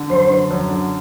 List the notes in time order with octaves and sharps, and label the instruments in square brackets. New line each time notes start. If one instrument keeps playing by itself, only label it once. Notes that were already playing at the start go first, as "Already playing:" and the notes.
Already playing: [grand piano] D3
[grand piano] F#2 [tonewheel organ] C5
[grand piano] D3
F#2
D3